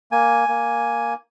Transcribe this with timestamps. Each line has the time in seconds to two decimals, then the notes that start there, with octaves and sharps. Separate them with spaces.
0.12 A#3 G#5
0.48 A#3